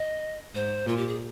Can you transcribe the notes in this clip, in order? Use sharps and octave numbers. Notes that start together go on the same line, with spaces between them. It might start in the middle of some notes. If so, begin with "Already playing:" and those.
Already playing: D#5
G#2 C5
A#2 F4
G4
G#4